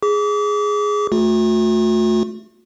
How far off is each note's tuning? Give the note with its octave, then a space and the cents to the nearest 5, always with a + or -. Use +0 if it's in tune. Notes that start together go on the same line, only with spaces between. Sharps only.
G#4 +0 D6 -35
A3 +0 F#4 -45